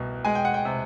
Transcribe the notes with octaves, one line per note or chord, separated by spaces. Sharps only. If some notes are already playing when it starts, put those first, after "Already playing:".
Already playing: C2 B2
G#3 G#5
G5
F#5
G5
C3